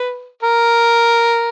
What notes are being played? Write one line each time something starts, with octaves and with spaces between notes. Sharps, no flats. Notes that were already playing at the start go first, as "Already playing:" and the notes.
Already playing: B4
A#4